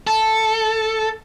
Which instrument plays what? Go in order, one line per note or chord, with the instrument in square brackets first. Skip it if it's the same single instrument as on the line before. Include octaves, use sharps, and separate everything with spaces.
[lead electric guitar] A4